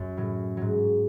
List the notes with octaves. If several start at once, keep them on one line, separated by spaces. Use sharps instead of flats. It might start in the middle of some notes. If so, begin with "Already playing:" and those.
Already playing: F#2
A2 F#3
G#2 F#3